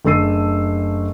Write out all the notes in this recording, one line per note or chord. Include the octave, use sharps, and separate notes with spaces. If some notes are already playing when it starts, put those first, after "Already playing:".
F#1 A3 D4 E6 C7 D#7